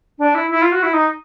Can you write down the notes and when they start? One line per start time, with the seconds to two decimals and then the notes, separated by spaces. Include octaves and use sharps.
0.19 D4
0.35 E4
0.51 E4
0.62 F4
0.72 F#4
0.83 E4
0.93 D#4